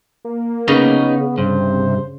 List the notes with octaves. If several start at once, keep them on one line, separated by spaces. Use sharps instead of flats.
A#3
C#3 B3 D#4 B4 D#5
G2 C3 C5